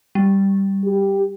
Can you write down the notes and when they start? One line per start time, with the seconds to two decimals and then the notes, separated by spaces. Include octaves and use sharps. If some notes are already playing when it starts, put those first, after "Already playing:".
0.15 G3
0.85 G4